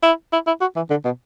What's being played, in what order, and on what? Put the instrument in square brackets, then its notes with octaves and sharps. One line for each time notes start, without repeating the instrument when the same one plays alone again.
[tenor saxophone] E4
E4
E4
F#4
E3
D3
B2